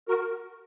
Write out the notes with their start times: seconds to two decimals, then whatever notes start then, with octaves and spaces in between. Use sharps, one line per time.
0.08 F#4 A#4